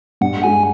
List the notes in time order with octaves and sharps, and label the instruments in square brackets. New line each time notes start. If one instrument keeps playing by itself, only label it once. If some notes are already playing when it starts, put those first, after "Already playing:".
[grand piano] G2 [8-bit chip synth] F#5
[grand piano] G#3 [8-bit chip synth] G#5